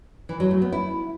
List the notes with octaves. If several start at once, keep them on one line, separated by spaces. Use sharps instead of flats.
E3
F#3
A3
B3
E4